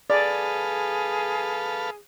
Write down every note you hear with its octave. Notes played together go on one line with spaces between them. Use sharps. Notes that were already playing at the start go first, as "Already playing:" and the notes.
G#4 A4 B4 D5 F5